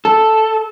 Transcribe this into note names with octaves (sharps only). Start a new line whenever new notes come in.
A4